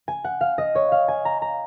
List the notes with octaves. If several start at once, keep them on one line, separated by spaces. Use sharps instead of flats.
G#5
F#5
F5
D#5
C#5
F5
G#5
A#5
A#5